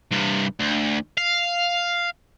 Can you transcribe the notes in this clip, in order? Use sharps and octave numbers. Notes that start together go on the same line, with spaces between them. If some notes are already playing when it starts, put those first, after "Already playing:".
G2 C3
D2
F5